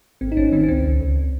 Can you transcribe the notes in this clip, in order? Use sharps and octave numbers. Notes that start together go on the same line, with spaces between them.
G#1 C4
D#4
G#1 C#4
D#3 C4
C#4
C#2 C4
C#2
C#2